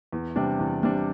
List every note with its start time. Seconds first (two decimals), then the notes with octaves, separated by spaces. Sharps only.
0.13 E2
0.36 C3 G3 D4
0.59 E2
0.83 C3 G3 D4